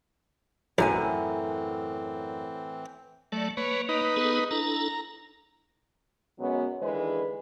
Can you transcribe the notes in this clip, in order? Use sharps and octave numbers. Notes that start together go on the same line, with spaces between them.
B1 F#2 A2 E3 C4 G4 F#5 G#5
F#3 A3 D5
A#3 B4 C#5
D#4 B4
B3 G#4 A4
D4 E4 A4 A#5
F#2 B2 F#3 G#3 B3 C#4
D#2 D3 E3 G#3 B4